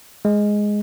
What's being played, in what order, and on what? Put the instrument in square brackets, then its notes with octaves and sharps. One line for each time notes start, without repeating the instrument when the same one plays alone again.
[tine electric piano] G#3